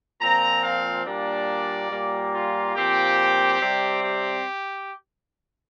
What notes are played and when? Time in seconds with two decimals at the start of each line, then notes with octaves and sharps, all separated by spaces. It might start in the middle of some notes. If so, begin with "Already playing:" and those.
0.20 A#2 F3 C4 A#5
0.63 F5
1.05 A#2 G3 A#3 D4 D5
1.91 A#2 G3 A#3
2.33 F4
2.75 A#2 F3 C4 G4
3.60 C3 G3 C4
4.03 G4